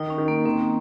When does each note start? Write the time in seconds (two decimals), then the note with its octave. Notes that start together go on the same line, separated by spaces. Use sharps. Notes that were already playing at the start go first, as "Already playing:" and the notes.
Already playing: D#3 D#4
0.10 C#4
0.18 D#3
0.28 A#3
0.46 D#3 C4